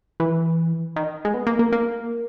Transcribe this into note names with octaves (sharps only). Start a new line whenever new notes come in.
E3
D#3
G#3
B3
A#3
A#3
A#3